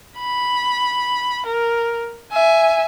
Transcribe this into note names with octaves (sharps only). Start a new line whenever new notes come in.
B5
A#4
E5 G#5